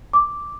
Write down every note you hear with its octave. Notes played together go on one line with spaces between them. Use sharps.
D6